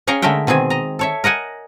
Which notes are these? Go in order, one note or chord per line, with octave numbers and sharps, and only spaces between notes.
C#4 G#4 C#5 F5 G5 A#5
D3 G#3 A3 A#4 E5 G5
B2 D#3 C4 G#4 G#5
D#5 A#5
A4 C#5 E5
A#4 D#5 F#5 G#5